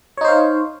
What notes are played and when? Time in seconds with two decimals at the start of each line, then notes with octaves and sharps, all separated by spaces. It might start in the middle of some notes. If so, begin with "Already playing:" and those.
0.17 C#5
0.21 D#4
0.25 C5
0.28 F5